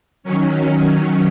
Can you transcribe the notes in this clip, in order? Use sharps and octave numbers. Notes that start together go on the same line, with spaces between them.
D#3 F#3 C#4